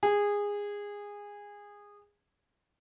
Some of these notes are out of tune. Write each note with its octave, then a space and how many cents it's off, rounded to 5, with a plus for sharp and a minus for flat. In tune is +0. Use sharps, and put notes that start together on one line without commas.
G#4 -20